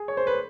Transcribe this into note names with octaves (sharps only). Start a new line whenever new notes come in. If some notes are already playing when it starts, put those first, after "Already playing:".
Already playing: G#4
C#5
C5
B4